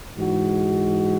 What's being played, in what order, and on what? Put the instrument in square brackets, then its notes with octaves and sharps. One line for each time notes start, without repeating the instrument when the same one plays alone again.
[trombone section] G#2 E3 G#3 F#4